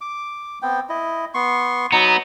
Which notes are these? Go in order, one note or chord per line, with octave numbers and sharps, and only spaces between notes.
D6
B3 C4 G5
E4 D#5
B3 C6 C#6
F#3 B3 D#4 A#5